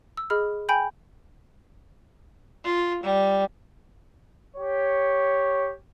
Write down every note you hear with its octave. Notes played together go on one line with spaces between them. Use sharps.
E6
G#4 D#5 B5 F6
G5 G#5 B5 G6
F4
G3
G4 C#5